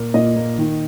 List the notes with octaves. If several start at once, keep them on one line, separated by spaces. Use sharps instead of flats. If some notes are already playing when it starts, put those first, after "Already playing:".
Already playing: A#2 A#3
A#2 D#5
A#3
D#3